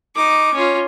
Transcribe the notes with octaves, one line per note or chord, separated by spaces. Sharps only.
D#4 D6
C#4 F4